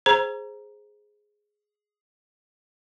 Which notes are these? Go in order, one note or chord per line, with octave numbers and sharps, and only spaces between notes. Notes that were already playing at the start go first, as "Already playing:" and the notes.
G#4 C5 A#5